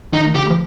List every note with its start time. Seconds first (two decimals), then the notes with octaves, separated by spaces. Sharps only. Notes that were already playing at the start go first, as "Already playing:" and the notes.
0.13 D#3 D#4
0.35 D3 G4
0.50 F3